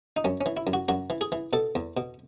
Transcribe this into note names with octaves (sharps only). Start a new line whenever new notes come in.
D#4
F#2 C#4
C#4
E3
E4
F#2
F#4
F#2 F#4
E3
G#4
E3
B2 A4
E2
B2